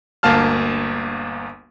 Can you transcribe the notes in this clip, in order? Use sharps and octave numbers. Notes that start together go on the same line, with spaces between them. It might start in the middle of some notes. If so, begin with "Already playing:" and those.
G1 D2 A#3 F5 A5 F6